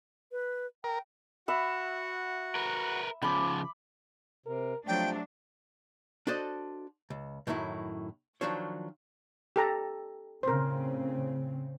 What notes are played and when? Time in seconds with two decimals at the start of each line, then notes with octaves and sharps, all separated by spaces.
0.32 B4
0.84 A#4 G5
1.48 F#4 E5 F#5 B5
2.55 A#4 B4
3.22 C#3 F3 B5 D6
4.46 C3 A#4
4.88 C3 F3 F#3 A3 D4 G5
6.27 D4 F#4 A4 C5 D5 D#5
7.10 C#2
7.47 F#2 A2 D#3 F#3 E4
8.41 D#3 F3 F#3 D4 C5 C#5
9.56 G4 A4 A#5
10.43 A2 C#3 C4 A#4 C5